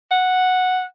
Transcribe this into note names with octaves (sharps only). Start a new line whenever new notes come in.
F#5